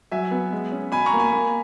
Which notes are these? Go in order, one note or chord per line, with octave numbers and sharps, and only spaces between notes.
F#3 E5 G#5
B3
G#3
C#4
B2 G#5 B5
A#5 C#6
A#3
G#5 B5
A#3